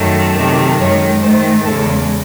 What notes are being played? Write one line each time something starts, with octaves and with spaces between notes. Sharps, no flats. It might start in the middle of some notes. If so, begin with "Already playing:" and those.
Already playing: F#2 D#3 F#3 A3
C3 D#3 F#3 A3
F#2 D#3 G#3 C#5
G#2 D#3 A3 C5
E2 C#3 G#3 A4